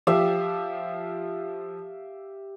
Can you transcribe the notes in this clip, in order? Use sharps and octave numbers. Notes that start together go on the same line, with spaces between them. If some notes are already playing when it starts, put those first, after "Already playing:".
F3 G4 E5 F5